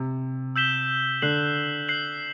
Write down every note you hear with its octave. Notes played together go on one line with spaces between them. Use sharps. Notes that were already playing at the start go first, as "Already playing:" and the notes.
Already playing: C3
E6 G6 B6 E7 G7
D3 F#6 C7 F#7
F#6 C7 F#7